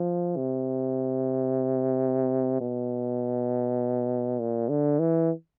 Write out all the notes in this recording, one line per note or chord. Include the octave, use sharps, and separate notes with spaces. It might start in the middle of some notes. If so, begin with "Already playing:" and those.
Already playing: F3
C3
B2
A#2
D3
E3